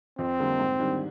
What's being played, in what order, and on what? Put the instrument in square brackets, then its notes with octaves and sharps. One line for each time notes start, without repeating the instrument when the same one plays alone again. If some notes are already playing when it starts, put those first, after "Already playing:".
[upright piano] F2 [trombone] C4
[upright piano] D3 G3 A#3
G#2
D#3 G3 D4